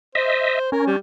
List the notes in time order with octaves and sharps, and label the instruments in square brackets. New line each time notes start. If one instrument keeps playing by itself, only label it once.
[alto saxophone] C5 [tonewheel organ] D#5 E5
[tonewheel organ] C#4 [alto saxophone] A#4
[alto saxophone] G3